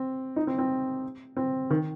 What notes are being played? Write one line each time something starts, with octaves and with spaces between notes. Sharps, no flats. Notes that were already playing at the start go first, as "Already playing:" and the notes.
Already playing: C4
D#4
C4
C4
C4
D#3